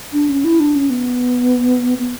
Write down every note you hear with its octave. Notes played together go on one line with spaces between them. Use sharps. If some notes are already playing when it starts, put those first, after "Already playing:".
D4
C#4
E4
D4
C#4
B3
B3